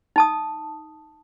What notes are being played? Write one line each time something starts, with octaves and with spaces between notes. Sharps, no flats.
D#4 A5 D#6